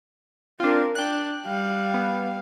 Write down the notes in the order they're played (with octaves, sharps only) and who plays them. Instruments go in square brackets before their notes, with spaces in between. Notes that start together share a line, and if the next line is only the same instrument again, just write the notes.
[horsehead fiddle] C4 A#4 [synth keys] D4 F4
[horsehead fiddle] D4 [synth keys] G5 F#6
[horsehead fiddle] G3 F5
[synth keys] B3